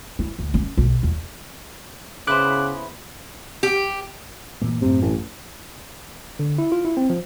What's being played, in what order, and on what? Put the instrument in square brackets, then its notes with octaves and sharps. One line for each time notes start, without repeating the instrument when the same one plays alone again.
[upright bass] E4
D2
C#4
B1
E2
[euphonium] C#3 [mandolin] B3 E4 C5 [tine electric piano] D6 F#6
[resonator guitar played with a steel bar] G4
[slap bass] A#2 E3 A#3
[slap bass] F#2 A2 [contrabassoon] C3
[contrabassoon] A1
[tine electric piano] D3
E4
F4
E4
C4
F3